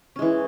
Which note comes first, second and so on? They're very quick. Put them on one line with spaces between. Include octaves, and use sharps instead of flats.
C#4 G#3 E3